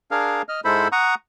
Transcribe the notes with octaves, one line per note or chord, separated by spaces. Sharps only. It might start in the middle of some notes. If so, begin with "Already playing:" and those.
D4 G#4 A#4 F5
D#5 F6
G#2 G#3 E4 A4 C5 B5
F#5 A#5 C#6 D#6